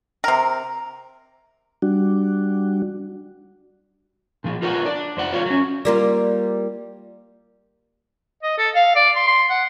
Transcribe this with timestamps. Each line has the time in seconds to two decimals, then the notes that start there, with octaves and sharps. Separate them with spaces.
0.24 C3 A#4
1.82 G3 D4 F#4
4.44 A#2 F3 G#4
4.62 F4 A#4 B4 C#5 F#5
4.85 D4 D5
5.17 F2 C5 F#5
5.33 F4 A#4 C#5 D5 F5
5.46 F#3 C#4
5.85 G3 A#3 F4
8.43 D#5
8.58 A4
8.75 F5
8.96 D5
9.16 C6
9.27 C6
9.50 F#5